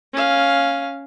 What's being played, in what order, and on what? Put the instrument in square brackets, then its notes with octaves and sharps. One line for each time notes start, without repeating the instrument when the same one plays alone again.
[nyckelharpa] C#4 F5